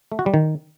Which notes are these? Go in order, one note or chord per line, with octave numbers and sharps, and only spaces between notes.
A3
F#4
G3
D#3